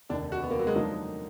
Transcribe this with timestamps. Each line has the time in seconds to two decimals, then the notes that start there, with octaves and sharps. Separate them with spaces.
0.10 F1 D#2 D3 D4
0.32 F#4
0.43 B3
0.51 A#3
0.59 F#3
0.67 G#3
0.75 D3 F3 F#3 A#3 D#4